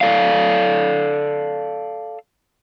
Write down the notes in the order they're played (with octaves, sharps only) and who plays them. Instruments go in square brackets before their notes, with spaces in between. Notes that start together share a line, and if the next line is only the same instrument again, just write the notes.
[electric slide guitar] A4 D5 F5